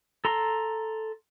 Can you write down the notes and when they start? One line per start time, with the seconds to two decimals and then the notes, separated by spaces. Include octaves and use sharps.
0.25 A4 A#5 C6